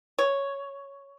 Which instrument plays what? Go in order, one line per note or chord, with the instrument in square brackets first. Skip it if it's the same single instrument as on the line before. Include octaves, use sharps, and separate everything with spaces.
[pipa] C#5